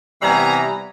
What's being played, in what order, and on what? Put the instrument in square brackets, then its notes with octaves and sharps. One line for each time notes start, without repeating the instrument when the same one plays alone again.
[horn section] C3 E3 G3 B3 G#5 A#5